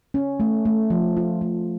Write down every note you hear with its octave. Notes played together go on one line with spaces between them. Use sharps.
C#4
A3
A3
F3
F4
A3